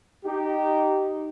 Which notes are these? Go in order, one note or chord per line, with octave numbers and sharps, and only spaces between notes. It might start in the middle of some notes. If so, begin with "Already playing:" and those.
D#4 G4